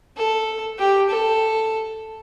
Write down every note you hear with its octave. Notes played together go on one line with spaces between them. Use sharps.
A4
G4
A4